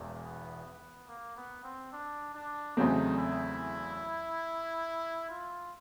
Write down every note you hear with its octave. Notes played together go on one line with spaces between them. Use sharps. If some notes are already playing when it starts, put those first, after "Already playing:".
Already playing: E1 E2 A#3
B3
B3
A#3
B3
C4
D4
D4
E2 C#3 F#3 A3 C4 D#4
E4
F4